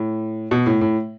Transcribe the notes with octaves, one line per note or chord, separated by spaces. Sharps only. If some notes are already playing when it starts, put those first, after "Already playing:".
Already playing: A2
B2
A2
A2